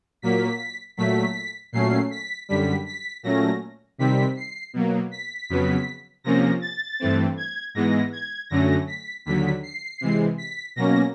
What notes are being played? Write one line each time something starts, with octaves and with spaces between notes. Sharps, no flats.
A#2 F#3 A#3 B6
A#2 F#3 A3 B6
A#2 F#3 A3 C#4 C7
B6
F#2 D3 G3 B6
B6
A#2 F#3 A3 C#4 A#6
C3 D#3 G3 C4 B6
C7
B2 F#3 A#3
B6
F2 C#3 F#3 B3
C3 F3 A#3 C#4 A#6
A6
G2 E3 A3 C4
G#6
G#2 E3 G#3 B3 A#6
G#6
F#2 D3 F#3 A3 C#4 A#6
B6
D#2 D3 F#3 B6
C7
C3 E3 G#3
B6
B2 F#3 A#3 C#4 A#6